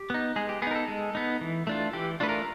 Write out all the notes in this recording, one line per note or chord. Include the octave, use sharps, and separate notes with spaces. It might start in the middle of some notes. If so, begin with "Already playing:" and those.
Already playing: G4
B3 D#4
G#3 G#4
G4
B3 D#4 G#4 A#4
A4
G#3
B3 D#4
E3
A3 D4 F4
E3 G4
A3 D4 F4 B4
A#4